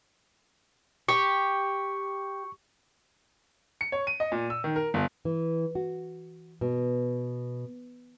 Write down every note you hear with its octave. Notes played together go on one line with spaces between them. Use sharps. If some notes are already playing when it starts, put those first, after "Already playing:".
G4 C#6
C#7
C#5
D#7
D#5
A#2
E6
D#3
A#4
G1
E3
F#4
B2